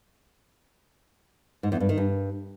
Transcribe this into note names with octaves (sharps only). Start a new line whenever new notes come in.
G#2
E2
G2
D#3
G2